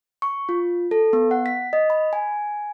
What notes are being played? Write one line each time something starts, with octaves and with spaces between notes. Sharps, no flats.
C#6
F4
A4
B3
F#5
B6
D#5
B5
G#5